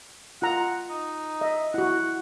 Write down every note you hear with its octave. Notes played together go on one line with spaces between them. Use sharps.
F4 F#5 A#5
D#4
D#5 E5
E4 F#4 F#5